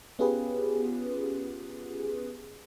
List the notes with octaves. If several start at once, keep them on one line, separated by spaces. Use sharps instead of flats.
B3 C#4 F4 G4 G#4 B4